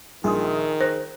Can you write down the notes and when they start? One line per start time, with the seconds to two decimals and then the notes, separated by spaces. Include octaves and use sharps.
0.24 A#1 D#3 G#4 C6 D#6
0.81 C5 F#6